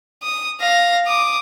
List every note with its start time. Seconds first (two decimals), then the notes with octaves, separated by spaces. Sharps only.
0.23 D#6
0.60 F5 A#6
1.07 D6 D#6